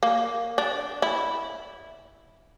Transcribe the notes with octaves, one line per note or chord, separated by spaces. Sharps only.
A#3
D4
E4